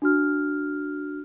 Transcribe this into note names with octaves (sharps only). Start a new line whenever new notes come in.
D4 F#4 F6